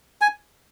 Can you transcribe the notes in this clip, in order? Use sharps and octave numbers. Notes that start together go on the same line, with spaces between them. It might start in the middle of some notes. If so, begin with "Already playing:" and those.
G#5